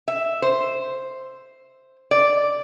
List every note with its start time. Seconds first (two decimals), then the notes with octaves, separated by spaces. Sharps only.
0.08 E5
0.42 C5
2.11 D5